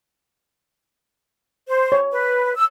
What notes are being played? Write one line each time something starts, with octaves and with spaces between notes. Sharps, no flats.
C5
C#5
B4
E6